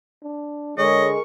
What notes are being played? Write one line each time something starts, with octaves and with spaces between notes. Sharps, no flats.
D4
D3 G#3 A#4 C#5 D#5 C#6